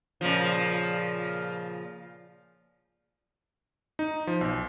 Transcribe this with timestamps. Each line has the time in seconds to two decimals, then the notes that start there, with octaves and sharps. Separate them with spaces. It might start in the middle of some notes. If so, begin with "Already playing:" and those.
0.21 A#2 C#3 F3
3.99 D#4
4.27 F3
4.41 B1